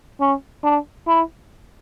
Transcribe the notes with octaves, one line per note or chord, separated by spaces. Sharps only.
C#4
D4
E4